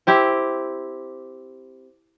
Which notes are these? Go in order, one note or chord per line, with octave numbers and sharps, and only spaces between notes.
C4 E4 G4